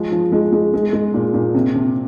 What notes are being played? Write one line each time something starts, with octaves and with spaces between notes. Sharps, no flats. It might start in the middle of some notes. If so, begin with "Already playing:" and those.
Already playing: F3 G#3
F3
G#3
G#3
G#3
G#3
A#2
A#2
C3
C3